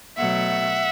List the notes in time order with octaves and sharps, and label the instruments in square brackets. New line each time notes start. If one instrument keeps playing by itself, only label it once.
[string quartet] B2 F#3 A3 E5 F#5